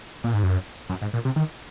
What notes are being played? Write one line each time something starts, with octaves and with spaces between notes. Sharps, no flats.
A#2
G#2
F#2
F#2
G#2
A#2
C3
D#3